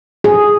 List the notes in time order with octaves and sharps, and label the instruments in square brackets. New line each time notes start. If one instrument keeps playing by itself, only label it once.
[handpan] G#4